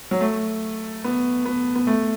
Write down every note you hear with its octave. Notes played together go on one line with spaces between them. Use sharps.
F#3
A3
B3
B3
B3
A3